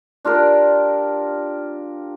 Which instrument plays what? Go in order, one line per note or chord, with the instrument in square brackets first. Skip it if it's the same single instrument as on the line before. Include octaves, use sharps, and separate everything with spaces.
[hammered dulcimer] D4 F4 G4 A#4